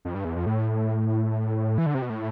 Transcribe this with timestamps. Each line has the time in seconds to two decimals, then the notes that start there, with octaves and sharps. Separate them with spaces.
0.05 F2
0.15 G2
0.25 E2
0.36 F2
0.46 A2
1.78 E3
1.86 D3
1.94 C3
2.02 B2
2.10 A2